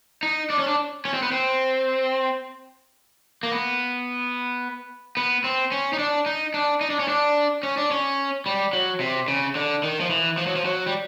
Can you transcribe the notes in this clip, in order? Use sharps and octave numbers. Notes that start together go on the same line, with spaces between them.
D#4
D4
C#4
D4
C#4
C4
B3
C4
A#3
B3
B3
C4
C#4
D#4
D4
D#4
D4
D#4
D4
C#4
D4
C#4
D4
C#4
G3
F#3
C3
C#3
D3
D#3
F3
E3
F3
F#3
F3
F#3
G3